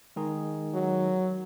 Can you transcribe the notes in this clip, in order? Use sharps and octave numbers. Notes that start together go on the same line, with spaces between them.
D#3 G#3 D#4 G#4
F#3